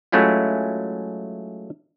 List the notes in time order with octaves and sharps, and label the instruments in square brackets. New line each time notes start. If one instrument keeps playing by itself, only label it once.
[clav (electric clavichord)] F#3 G#3 A3 C#4 E4 F4